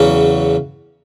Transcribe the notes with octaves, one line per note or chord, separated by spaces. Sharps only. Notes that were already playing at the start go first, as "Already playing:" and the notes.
Already playing: E2 C#3 F#3 C#4